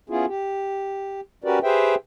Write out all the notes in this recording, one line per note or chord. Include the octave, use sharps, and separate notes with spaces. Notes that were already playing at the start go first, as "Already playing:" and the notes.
B3 C#4 E4 F4 G#4
G4
C#4 F#4 G4 A#4 B4 D5
G4 G#4 B4 C5 E5 G5